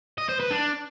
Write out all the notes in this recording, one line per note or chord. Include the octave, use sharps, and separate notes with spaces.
D#5
C5
B4
D4